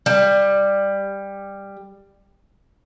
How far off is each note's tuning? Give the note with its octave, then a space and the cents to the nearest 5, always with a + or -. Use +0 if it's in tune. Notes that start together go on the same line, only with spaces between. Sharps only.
G3 +10